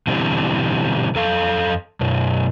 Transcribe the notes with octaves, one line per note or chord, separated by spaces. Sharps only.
B2 D3 E3 G3 C4
F2 A4 F5
F#2 B2